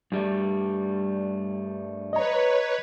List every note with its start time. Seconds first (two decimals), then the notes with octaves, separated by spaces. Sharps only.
0.12 G2 G3 A3
2.13 B4 C#5 D#5 A#5